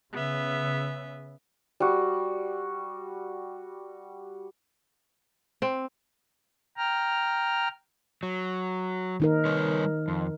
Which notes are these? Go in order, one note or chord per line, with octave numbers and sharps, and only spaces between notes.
C#3 B3 E5
G3 F#4
C4
G5 A#5 F6
F#3
D#3 D#4 A#4
G3 B4 C#5
F2